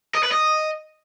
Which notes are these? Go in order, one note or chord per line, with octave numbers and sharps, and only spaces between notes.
D#5
B4
D#5